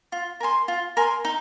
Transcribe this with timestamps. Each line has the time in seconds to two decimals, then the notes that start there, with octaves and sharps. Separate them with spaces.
0.12 F4
0.40 A#4 G#5 C6
0.68 F4
0.97 A#4 G#5 C6
1.25 D#4